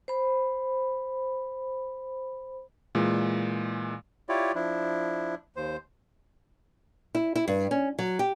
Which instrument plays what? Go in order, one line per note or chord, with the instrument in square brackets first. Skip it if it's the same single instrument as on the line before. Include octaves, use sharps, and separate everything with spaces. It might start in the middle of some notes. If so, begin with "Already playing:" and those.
[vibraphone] C5 B5
[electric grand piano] A#2 E3 G#3
[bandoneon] E4 F4 G4 C#5 D5
F3 D4 E4
D#2 C5
[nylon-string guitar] E4
E4
G2
C#4
F#3
G4